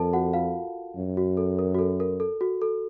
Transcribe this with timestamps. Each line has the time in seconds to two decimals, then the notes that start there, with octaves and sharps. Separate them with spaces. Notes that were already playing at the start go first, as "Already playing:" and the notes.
Already playing: F2 A4 A#4 A5
0.13 F#4 F#5
0.33 F4 F5
0.96 F#2
1.17 F#4
1.37 A4
1.59 A#4
1.75 F#4
1.79 A4
2.00 A#4
2.20 A4
2.41 F#4
2.62 A4